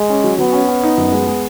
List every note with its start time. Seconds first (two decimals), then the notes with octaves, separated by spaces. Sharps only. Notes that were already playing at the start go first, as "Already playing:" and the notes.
Already playing: G#3
0.09 C#4
0.24 F#3
0.38 F#3 B3
0.53 C#4
0.68 C#4
0.83 D#4
0.98 F#2
1.12 G#3
1.27 G#3